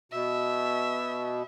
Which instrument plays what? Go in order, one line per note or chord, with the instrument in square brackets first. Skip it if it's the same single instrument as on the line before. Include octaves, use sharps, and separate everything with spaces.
[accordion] B2 [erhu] E5